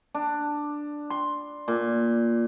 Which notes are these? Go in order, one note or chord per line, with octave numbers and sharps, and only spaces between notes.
D4
C6
A#2